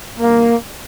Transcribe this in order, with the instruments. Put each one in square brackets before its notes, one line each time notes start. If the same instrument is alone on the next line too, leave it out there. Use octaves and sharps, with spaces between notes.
[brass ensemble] G2 D#3 A#3